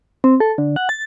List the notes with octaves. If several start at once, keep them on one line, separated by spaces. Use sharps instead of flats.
C4
A4
D3
F#5
A6